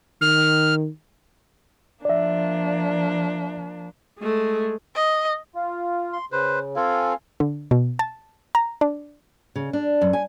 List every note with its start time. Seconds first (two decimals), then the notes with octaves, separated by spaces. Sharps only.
0.21 D#3 F6
2.05 F3 A#3 D4 D5 E5
4.19 G#3 A3
4.95 D#5
5.55 F4
6.13 C6
6.32 C#3 B4 C5
6.76 C4 F4 A4 F5 G#5
7.40 D3
7.71 B2
7.99 A5
8.55 A#5
8.81 D4
9.56 C#3
9.73 D4
10.01 F#2
10.13 G#5